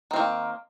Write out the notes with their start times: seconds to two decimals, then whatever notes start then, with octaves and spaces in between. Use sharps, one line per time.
0.11 D#3
0.13 C4
0.16 A#3